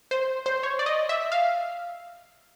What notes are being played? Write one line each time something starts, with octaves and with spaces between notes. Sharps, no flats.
C5
C5
C#5
D5
D#5
E5
F5